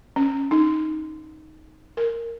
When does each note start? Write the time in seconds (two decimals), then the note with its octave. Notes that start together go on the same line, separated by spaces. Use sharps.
0.16 C#4
0.51 D#4
1.97 A#4